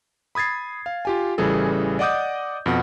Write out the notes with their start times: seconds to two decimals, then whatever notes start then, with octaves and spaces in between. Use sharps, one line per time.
0.35 B5 D#6 G#6 A6 C7
0.86 F5
1.05 F4 G4 G#5
1.38 A1 C#3 E3 G3 G#4 A4
1.99 D5 D#5 F#5 D6 D#6 G6
2.66 F2 B2 F#5